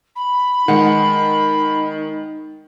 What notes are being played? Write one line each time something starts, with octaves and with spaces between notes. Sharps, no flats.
B5
D#3 G#3 D#4 F#5